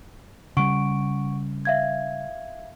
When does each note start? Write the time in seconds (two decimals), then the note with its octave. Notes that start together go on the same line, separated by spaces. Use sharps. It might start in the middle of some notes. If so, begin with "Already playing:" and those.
0.57 C#3 G3 F#5 C#6 D7
1.65 E5 F5 G#6